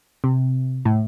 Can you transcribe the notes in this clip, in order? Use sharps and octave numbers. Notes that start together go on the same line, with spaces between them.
C3
A2